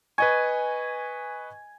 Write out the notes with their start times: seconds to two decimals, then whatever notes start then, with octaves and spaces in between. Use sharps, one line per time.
0.18 B4 D#5 G#5 C#6